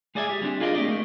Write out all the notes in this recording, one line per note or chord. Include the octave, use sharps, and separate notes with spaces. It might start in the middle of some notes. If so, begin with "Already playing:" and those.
G#3 G#4 D5 E5 G#5
G4
G3 C4 D4
F4 G#4 A#4 D5 D#5
A3 C4 G4 D5 D#5
A3